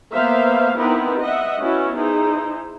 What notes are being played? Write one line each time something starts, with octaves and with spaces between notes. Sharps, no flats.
A#3 B3 C5 E5 F5
B3 C4 D#4 E4 A#4 B4
D#5 E5 F#5
B3 C#4 E4 F#4
D#4 E4 G#4 C5